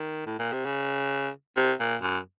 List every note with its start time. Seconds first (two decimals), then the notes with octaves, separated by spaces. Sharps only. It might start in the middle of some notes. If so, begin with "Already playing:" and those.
Already playing: D#3
0.26 A2
0.39 A#2
0.53 C3
0.65 C#3
1.57 C3
1.80 A#2
2.02 F#2